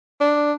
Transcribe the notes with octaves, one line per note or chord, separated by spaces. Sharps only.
D4